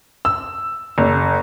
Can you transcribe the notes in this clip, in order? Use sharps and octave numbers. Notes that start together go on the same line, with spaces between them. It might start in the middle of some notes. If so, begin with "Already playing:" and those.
E6
F#1